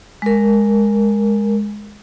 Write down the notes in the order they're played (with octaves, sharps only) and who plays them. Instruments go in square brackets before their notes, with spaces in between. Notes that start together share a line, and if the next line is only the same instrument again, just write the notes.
[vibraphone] G#3 A#4